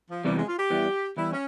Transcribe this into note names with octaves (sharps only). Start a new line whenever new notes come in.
F3
E2 C3 E3 G3
G#3
F4
G4
E2 E3 G3
E2 E3 G3 E4
C#4